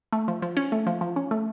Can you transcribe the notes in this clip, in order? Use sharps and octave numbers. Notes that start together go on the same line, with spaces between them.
A3
F3
F3
C#4
A3
F3
F3
C#4
A3